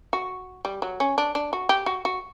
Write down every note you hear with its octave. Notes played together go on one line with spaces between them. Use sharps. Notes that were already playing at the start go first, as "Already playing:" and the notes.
F#4
G3
F#3
C#4
D4
D4
F#4
G4
F#4
F#4